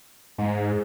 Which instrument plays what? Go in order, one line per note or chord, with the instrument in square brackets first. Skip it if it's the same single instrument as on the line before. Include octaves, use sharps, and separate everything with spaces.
[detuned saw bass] G#2